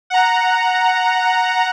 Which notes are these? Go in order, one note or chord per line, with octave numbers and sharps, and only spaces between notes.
F#5 A#5